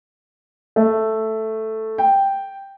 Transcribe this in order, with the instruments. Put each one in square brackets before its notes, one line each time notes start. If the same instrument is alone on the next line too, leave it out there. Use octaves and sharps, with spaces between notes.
[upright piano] A3
G5